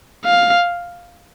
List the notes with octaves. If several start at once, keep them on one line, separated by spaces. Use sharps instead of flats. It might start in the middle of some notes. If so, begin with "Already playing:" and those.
F5